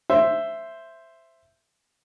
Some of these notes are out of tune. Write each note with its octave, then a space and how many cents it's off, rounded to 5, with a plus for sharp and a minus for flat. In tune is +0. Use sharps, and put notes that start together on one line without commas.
C5 +0 E5 +10